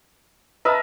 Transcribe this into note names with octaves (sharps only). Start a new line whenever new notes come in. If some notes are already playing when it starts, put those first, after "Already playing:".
A#4 B4 D#5 E5 A5